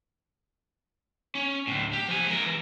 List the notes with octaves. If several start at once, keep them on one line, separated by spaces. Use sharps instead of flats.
C#4
D2 A2
G4
F3 G#5
G#3 A#4
E3